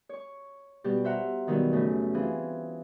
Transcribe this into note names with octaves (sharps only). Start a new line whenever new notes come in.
C#5 C#6
B2 G3 G4
C5 E5 F#5 A#5
B2 D#3 E3 F#3 G3 B3
F#2 C#3 A3
E3 C4 F4 G#4